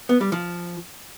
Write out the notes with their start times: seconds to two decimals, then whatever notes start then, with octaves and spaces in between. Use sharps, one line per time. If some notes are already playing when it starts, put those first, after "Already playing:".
0.09 B3
0.21 G3
0.32 F3